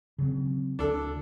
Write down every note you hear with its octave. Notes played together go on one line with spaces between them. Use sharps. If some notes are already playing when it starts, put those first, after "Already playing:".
C#3 F#3 C4
D2 D4 A4